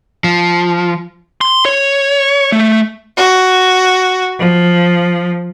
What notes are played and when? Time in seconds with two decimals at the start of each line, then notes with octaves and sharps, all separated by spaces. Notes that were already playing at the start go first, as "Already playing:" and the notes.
0.24 F3
1.41 C6
1.65 C#5
2.52 A3
3.16 F#4
4.38 F3